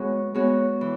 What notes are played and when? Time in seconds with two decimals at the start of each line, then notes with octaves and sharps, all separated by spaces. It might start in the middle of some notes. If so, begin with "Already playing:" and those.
Already playing: G#3 B3 F#4 C#5
0.34 G#3 B3 F#4 C#5
0.81 E3